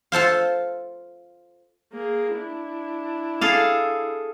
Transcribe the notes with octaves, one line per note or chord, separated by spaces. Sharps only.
F4 A4 C5 F5
A#3 G#4
D4 E4
G#4 A4 F5